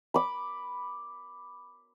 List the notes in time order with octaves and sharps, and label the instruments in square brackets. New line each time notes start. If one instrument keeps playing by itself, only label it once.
[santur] B5 D6